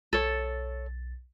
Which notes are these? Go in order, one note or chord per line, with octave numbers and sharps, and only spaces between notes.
B1 A4 C#5 A6